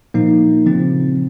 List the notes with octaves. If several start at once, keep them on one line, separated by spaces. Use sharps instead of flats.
A#2 F3 A#3 D#4
C#3 F3 C4